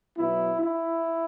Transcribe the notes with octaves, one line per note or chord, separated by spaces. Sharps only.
B2 F#3 B3 E4
E4